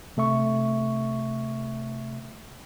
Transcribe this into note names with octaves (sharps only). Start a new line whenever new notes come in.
C3 A3 E5 C#6